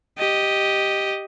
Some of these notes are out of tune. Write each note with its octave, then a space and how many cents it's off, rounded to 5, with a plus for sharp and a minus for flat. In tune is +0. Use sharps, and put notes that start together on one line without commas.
G4 +0 D#5 +0